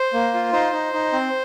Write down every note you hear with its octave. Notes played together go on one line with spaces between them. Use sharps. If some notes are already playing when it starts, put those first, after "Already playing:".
Already playing: C5
A#3
F4
D#4 C5
D#4
D#4
C4